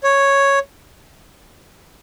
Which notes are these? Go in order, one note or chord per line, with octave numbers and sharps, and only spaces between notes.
C#5